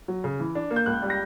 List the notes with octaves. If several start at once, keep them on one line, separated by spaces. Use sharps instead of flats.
F#3
C#3
E3
D4
A#3
G6
C#2 F#6
G3
A#6